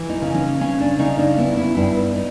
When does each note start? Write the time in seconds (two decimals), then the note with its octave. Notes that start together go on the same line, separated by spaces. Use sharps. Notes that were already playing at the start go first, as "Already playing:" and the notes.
Already playing: E3
0.09 D#4
0.22 C#3
0.34 C#4
0.61 C#3 C#4
0.80 D4
0.99 C#3 D#4
1.19 D4
1.38 B3 E4
1.57 E4
1.77 G2 E4
2.15 D#4